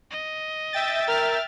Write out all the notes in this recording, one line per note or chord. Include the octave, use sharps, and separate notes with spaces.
D#5
E5 G5 A6
A#4 F6